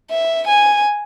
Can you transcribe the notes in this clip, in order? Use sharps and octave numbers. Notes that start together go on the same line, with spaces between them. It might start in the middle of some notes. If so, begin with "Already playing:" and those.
E5
G#5